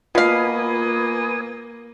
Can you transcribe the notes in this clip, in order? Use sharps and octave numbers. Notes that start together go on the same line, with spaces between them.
B2 A#3 F4 B4 F5 G#5 B5 D#6